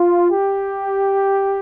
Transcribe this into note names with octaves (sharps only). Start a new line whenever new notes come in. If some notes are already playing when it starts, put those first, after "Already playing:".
Already playing: F4
G4